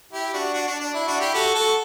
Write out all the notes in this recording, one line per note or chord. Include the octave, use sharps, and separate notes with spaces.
E4 G4
D4 F#4
D4 F#4
D4
D4
E4
D4 F#4
E4 G4
F#4 A4
F#4 A4